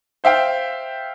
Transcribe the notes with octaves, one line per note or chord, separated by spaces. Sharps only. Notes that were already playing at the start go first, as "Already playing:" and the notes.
C5 E5 F5 G5